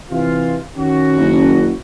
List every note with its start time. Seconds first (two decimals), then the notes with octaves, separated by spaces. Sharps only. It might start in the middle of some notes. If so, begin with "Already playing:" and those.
0.11 C3 E3 F4
0.77 D#3 C#4 F#4
1.17 F#1